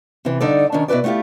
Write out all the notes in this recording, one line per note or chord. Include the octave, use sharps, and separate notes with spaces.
C3 E3
G2 D3 D#4 A4 D5
D#3 C#4 D4
B2 E4 G4 B4 D5
A3 B3 E4 F4 G4